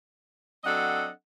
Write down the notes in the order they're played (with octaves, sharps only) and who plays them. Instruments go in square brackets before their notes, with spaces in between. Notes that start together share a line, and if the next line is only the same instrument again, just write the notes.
[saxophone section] F#3 C4 D4 A4 D#5 F#5